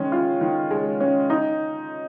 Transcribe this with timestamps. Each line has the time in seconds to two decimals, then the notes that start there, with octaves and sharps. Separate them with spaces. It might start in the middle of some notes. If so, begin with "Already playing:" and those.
Already playing: D#3 G#3 C#4
0.12 F4
0.41 D#3
0.71 G#3
1.00 C#4
1.30 D#4